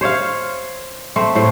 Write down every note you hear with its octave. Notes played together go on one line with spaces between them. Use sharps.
C5 C#5 E5 F5
A3 C4 C5
A2 C5